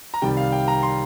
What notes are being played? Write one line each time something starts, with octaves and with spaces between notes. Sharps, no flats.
A#5
C2 C3 D#3 G3 G5
F5
G5
A#5
C6